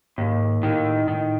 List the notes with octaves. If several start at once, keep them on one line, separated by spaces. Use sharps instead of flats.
D#2 G#2
A2 D#3
A2 D#3